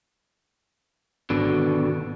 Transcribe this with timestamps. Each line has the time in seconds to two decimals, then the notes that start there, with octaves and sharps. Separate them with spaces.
1.30 G#1 B2 D3